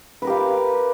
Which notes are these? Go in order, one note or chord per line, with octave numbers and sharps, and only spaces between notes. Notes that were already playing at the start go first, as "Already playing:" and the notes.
G4 A#4 B4 F5